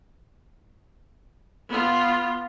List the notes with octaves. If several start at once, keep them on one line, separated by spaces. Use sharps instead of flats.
B3 F4